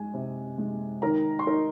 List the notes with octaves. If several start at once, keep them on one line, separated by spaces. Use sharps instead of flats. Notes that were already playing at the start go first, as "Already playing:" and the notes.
Already playing: G#3 G#5
C3
G#3
D#3 A#4 A#5
C6
D#4 A#4 A#5